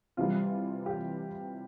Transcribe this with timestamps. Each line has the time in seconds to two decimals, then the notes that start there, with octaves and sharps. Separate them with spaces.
0.17 C3 E3 G3 F4
0.86 G4